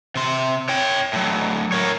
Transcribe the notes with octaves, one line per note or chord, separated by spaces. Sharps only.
C3 C6
C#5 G5
A2 F#3
A#4 C#5